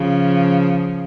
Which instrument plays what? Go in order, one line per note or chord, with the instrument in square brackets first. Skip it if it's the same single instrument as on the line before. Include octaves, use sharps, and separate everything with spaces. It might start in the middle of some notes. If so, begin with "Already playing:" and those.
Already playing: [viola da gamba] C#3 F3